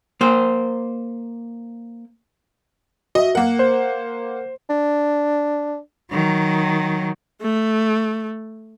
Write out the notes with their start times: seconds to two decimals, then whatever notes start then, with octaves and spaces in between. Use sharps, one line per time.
0.21 A#3 C5
3.15 F#4 D#5 E5
3.35 A#3 A#4 F#5
3.59 C5
4.69 D4
6.11 D#3 F#3
7.41 A3